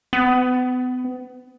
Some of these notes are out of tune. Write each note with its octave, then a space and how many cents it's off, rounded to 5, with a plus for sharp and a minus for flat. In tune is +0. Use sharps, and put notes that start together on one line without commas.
B3 +35